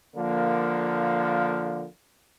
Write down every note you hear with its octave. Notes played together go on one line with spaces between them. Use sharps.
D3 F3 A#3